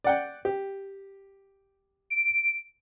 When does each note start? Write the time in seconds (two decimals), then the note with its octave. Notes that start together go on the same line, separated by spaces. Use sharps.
0.04 D5 F#5 G5
0.45 G4
2.10 D7